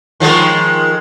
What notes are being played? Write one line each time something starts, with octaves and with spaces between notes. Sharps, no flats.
D#3 F3 G#3